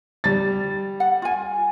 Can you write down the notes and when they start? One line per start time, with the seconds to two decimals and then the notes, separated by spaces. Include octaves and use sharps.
0.24 G3 A6
1.00 F#5
1.22 F4 G#5